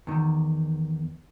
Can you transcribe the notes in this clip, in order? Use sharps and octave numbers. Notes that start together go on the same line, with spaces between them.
E2 D#3